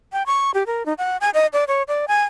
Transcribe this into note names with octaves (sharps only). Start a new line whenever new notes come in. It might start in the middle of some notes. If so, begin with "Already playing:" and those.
G5
C#6
G4
A#4
D#4
F#5
G#5
D#5
D5
C#5
D5
G#5